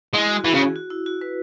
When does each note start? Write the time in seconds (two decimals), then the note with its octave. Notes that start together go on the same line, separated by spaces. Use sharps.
0.13 G#3 E4
0.29 F#4
0.41 F#4
0.44 E3 G#4
0.54 C#3
0.60 F#4
0.76 F#4
0.90 E4
1.06 F#4
1.21 B4